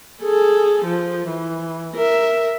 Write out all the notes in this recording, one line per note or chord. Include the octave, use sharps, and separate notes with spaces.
G#4 A4
F3
E3
A#4 E5